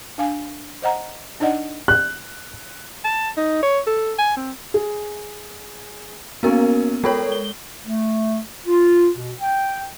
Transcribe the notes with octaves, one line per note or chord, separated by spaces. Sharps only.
D4 F5 G#5
C5 D#5 F#5 A#5
D4 D#4 D5 D#5 F#5
F#6
A5
D#4
C#5
A4
G#5
C4
G#4
A#3 B3 C#4 F#4 A#4
G#3 A4 A#4 C#5 G5 B5
G7
A3
F4
B2
G5